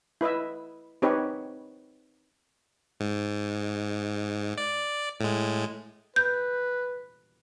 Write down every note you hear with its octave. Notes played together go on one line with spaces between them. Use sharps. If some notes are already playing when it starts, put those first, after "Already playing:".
E4 B4 D#5 E5
C4 D#4 G4 B4 C#5
G#2
D5
A2 G#3
B4 G6